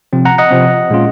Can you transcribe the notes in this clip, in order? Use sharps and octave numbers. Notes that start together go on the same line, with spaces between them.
C3 F3 C4
F#5 A#5
D#5 F#5
C3 F3 C4
A#2 G#3 C#4 F4